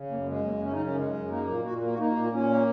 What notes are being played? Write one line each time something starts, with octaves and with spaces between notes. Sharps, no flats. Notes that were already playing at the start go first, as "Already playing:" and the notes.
Already playing: C#3
F#2 A#3
G#3 C#4
F#2 A#3
C#3 C#4
D#4
F#2 C#4
G#3
F#2
A#3 D#4
A#2
A#2 F#4
A#3
F#4
A#3 D#4
A#2
A#2 C#4
A#3